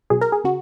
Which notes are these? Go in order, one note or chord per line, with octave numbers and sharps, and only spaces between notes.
B2 F#3 G#4
A#4
G#4
C#3 F#4